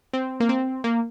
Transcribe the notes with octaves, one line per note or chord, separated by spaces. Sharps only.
C4
A#3
C4
A#3